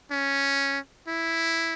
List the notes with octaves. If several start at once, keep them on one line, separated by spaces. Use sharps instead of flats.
C#4
E4